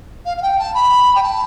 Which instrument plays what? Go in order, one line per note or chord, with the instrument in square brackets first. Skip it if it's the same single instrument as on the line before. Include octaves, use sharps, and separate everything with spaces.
[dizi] F5
F5
G5
A5
B5
G5
A5